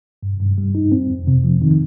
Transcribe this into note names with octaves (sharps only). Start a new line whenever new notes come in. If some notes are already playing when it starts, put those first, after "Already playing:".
G2
G2
G3
D#4
C4
F2
C3
F3
D#3